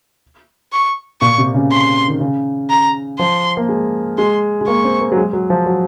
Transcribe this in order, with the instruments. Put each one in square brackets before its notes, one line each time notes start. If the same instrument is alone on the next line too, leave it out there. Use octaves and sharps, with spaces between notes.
[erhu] C#6
[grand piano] A#2 [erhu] C#6
[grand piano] C3
C#3
[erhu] C6
[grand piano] D#3
C#3
[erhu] A#5
[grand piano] F3 [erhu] C6
[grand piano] A#3
G#3
[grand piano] G#3 [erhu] C6
[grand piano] G#3
[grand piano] A#3 [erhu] C#6
[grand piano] C4
A#3
F#3
G#3
F#3
F3
F#3